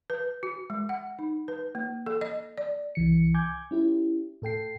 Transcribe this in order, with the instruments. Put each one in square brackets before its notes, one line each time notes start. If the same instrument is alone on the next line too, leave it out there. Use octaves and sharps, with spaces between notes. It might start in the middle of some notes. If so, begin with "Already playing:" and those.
[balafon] B4
F#4
G#3
F#5
D#4
B4
A#3
A4
D#5
D5
[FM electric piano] C2 E3 C#7
G#5 D6 G6 G#6
C#4 E4 G4
A2 A4 G5 C7